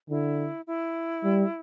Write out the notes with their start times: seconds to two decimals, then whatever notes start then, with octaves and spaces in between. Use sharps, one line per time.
0.10 D3 E4
0.67 E4
1.24 G3